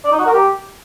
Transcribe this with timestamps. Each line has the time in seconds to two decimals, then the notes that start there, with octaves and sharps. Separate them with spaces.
0.05 D5
0.12 D#4
0.19 F#4
0.26 A#4
0.33 G4